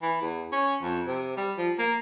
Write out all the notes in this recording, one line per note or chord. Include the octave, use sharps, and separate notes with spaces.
E3
E2
C#4
F2
C3
G3
F3
A#3